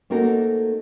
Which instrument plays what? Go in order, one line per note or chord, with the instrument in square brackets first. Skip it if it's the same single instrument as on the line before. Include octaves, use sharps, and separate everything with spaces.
[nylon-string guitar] A3 A#3 C4 D#4 F#4 A#4